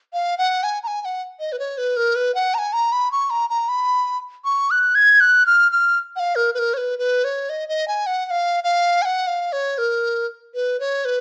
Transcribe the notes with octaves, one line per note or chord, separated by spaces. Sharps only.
F5
F#5
G#5
A#5
G#5
G#5
F#5
D#5
B4
C#5
B4
A#4
B4
F#5
A#5
G#5
A#5
B5
C#6
A#5
A#5
B5
C#6
F#6
G#6
F#6
F6
F6
F#5
F5
A#4
B4
A#4
C#5
B4
B4
C#5
D#5
D#5
G#5
F#5
F#5
F5
F5
G#5
F#5
F5
C#5
A#4
B4
C#5
B4